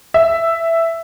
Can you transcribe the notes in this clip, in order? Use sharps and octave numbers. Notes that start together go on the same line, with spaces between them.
E5